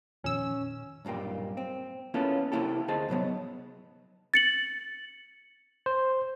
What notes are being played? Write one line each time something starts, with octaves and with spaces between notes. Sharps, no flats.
F2 A#2 D#3 C#4 E6
B1 G2 A#2 A#3 G4
C4
A#3 B3 C#4 E4 F4 A4
C3 D#3 A#3 E4 G4 A4
D2 G#4 C5 D#5 A5
G#2 C3 F#3 B3
A6 C#7 F#7
C5